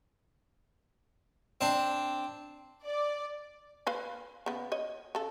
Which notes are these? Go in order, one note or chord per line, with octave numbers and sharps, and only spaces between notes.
C4 D4
D5
B4 F5 B5
C#3 B3
C#5 D#5
C#3 A4